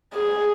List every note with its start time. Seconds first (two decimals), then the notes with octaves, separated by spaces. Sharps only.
0.14 G#4